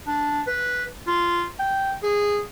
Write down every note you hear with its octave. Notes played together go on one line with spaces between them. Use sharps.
D4
B4
F4
G5
G#4